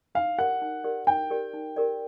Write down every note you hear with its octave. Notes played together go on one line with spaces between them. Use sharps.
D#4 F5
G4 A#4 D5 F#5
D#4
G4 A#4 D5
D#4 G5
G4 A#4 D5
D#4
G4 A#4 D5